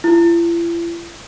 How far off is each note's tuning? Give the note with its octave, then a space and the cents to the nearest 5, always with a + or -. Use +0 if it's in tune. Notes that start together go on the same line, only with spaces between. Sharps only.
E4 +45